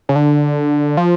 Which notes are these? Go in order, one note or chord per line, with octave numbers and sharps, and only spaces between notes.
C#3
D3
F3